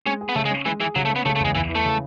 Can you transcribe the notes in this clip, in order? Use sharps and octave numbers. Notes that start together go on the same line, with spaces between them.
G#3 C#4
G#4
B3
C#3 A3
G#3
C#4
E3 G#3
E3 G#4
C#3 F#3
A3
C#4
B3
C#3 A3
A3
E2 G#3
E2 E3
E3
A3
C#3